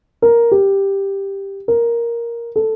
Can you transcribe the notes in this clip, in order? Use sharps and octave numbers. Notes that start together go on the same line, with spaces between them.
A#4
G4
A#4
A4